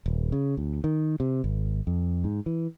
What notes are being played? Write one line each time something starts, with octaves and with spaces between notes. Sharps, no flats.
D#1
C#3
D2
D#3
C3
G#1
F2
G#2
E3